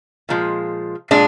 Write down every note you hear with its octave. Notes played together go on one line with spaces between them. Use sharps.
A#2 F3 G#3
A#2 G#3 D4